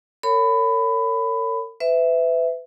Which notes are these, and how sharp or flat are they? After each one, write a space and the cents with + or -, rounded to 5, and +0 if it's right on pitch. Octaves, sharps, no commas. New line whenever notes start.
A#4 -45 C#5 +0 B5 +20
B4 +30 E5 +0